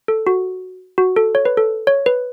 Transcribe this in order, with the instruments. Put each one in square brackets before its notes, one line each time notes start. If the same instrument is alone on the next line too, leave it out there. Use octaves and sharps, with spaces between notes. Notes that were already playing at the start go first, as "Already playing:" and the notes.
[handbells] A4
F#4
F#4
A4
C#5
B4
A4
C#5
B4